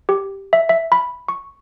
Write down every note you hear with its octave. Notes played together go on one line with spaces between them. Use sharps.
G4
E5
E5
B5
C#6